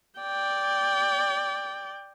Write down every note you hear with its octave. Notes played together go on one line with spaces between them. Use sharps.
D5 G5